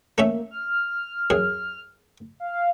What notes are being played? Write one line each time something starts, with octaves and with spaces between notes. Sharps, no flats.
A3 A#3 C#4 E5
F6
F#2 G#4
F5